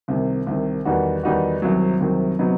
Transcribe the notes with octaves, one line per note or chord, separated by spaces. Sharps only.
C2 C3 D#3
C2 C3 D#3
E2 D#3 G3 D#4 F#4
E2 D#3 G3 D#4 F#4
C2 C3 D#3 F#3
C2 C3 D#3 F#3
C3 F#3 B3 D#4